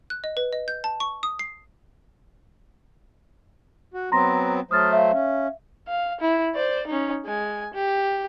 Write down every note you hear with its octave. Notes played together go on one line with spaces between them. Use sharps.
F#6
D#5
B4
D#5
G6
A5
C#6
D#6
C7
F#4
F#3 B3 C4 A#5 C6 A#6
F#3 A3 C5 D#6 F6 A6
E5 F5
C#4
F5
E4
C5 D5
C#4 D#4
G#3 G#5
G4